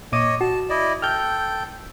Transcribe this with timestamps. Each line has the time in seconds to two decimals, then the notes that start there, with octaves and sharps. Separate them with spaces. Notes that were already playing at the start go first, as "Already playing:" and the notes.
0.12 A#2 C#5 D#5 D6 D#7
0.41 F#4 A5
0.70 E4 D5 D#5
1.02 A4 G5 F6 G6